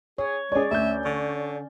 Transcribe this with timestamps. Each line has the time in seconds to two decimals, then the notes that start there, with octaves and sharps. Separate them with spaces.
0.18 G#4 C#5
0.52 G#3 C#4 G#4 C#5 D5
0.71 D2 E5 G6
1.05 D3 C#6